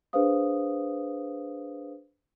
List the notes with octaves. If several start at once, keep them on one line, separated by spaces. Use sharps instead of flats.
D4 G#4 B4 C5 F5 D#6